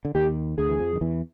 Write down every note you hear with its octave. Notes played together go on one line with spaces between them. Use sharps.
D3
D#2 D#3 G4
D2 D3 G#4
E3
F2 F3
D#3
E2 E3